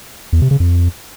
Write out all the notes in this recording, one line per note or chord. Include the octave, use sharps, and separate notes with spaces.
E2
C3
C#3
F2